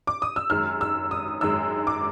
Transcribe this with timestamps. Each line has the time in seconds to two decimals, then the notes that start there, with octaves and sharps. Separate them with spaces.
0.07 D6
0.22 D#6
0.36 E6
0.50 F#2 D#3 G#3 F6
0.81 E6
1.11 D#6
1.41 F#2 D#3 G#3 E6
1.87 D6